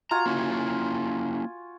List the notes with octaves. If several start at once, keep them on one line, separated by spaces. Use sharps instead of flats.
F4 F#4 G#5 A#5
A#3 C#4 E4